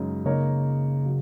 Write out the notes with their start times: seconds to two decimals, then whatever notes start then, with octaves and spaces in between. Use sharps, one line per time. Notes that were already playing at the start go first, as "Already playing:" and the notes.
Already playing: F#2 C#3 G#3 D#4
0.25 C#3 A#3 D#4 A#4 C#5
1.06 F#3